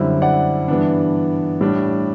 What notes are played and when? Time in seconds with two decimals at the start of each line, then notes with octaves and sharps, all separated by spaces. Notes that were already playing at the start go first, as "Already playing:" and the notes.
Already playing: F#2 D3 G3 C4 E4
0.22 D5 F#5
0.68 G2 E3 B3 D4
1.61 A2 G3 D4